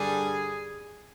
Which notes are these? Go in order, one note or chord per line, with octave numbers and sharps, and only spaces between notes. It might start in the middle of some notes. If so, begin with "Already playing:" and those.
Already playing: G2 D3 G3 G#4